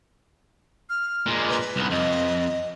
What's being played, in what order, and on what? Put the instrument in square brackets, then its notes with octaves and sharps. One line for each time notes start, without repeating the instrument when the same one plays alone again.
[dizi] F6
[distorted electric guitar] A#2 G#3
[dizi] B4
[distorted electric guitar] C2 B3
[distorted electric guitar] F2 [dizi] D#5